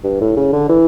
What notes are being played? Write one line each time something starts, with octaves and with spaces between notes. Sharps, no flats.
G2
A2
C#3
D3
E3